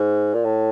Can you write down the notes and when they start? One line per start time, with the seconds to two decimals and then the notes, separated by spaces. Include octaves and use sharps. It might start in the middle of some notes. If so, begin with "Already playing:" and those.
Already playing: G#2
0.34 A#2
0.44 A2